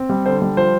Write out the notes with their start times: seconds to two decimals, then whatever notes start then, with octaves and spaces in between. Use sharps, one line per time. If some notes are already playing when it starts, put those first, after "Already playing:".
Already playing: C4
0.09 G3
0.25 D3 C5
0.42 G3
0.57 F3 C5